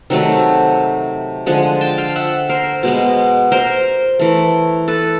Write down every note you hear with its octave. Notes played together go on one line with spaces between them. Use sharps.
C3 D#3 F#3 A3 E5 F#5
D3 F3 G#3 F#5 G#5
G5 A5
F5 G5
E5 F#5
A#4 C5
B2 G#3 B3
A#4 C5
E3 A3
A4 B4